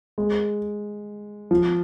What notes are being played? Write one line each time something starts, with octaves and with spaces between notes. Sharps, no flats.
G#3
F3